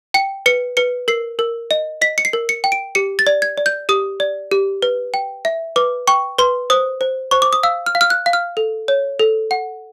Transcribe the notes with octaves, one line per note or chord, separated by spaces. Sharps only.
G5 C#7
B4 C#7
B4 C#7
A#4 C7
A#4
D#5
D#5 B6
C#7
C7
A#4
C#7
G5
D7
G4 C#7
A6
D5
G#6
D5
G6
G4 D#6
D5
G4
B4
G5
E5
B4 D6
G5 C#6
B4 C6
C5 D#6
C5
C5 C#6
D6
D#6
F5 E6
F6
F5
F6
F#6
F5
F6
A4
C#5
A4
F#5